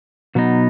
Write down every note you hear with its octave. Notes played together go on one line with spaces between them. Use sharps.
B2 F#3 B3 D#4